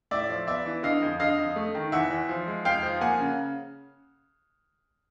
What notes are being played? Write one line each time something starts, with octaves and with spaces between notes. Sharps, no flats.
A2 D5 E5
F3
B3 D5 E5
E3
D3 D#5 F5
F2
D3 D#5 F5
F2
A3
D#3
E2 E5 F#5
E2
F3
G#3
F2 F5 G5
F3
A#3 F#5 G#5
C#3